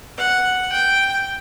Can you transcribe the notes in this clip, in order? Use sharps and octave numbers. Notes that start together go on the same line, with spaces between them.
F#5
G5